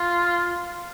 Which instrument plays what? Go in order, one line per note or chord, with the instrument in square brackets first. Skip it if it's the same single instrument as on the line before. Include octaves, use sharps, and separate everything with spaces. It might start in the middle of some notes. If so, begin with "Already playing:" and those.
Already playing: [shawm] F4